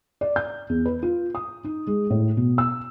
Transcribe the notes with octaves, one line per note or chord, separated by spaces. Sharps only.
D5
G6
E2
B4
F4
D#6
D#4
G#3
A2
B2
E6